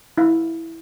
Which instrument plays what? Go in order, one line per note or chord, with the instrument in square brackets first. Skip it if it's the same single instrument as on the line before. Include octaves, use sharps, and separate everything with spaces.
[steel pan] E4 F5